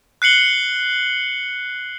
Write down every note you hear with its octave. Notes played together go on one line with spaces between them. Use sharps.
F#6 C7 C#7 F#7 G7